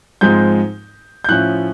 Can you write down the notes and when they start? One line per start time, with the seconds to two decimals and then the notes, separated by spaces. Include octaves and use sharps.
0.21 G#2 F3 G#3 C4 D#4 G6
1.24 G6
1.29 A2 F3 A3 C#4 F#6